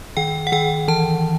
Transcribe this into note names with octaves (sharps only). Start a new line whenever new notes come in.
D#3 G5
F#5
D#3 G5
E3 A5